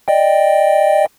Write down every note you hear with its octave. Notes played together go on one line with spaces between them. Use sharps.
D5 D#5 G5